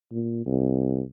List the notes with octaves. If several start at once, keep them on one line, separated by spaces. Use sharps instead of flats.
A#2
C2